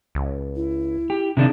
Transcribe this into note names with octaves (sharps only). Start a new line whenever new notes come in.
C#2
E4
G4
C3 D#3 D4 G#4